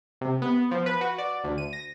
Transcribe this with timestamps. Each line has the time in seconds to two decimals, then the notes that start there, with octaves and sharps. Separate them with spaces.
0.21 C3
0.42 B3
0.71 F3
0.86 B4
1.01 F#4
1.18 D5
1.44 D2
1.58 D#7
1.73 A#6